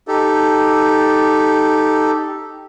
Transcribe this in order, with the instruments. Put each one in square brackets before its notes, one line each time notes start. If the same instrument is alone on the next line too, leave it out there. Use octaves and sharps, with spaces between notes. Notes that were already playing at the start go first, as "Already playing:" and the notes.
[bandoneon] D#4 G4 A4